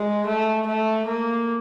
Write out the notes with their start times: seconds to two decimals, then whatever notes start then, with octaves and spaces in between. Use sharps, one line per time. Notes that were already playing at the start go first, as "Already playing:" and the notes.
Already playing: G#3
0.27 A3
0.67 A3
1.07 A#3